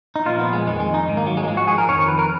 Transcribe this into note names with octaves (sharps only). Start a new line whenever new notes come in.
D#4
A#2 F3 F4
B3
G#3
F2 D#3 G#3
G#3
D#4
G#2 D#3
A#3
F#3
G#3
A#3
G#2 F3 G#3
F#4
G#4
A#4
F2 D#3 C#5
B4
A#4